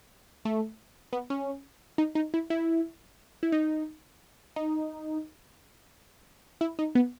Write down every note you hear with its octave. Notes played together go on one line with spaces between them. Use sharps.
A3
B3
C#4
D#4
D#4
E4
E4
E4
D#4
D#4
E4
D#4
B3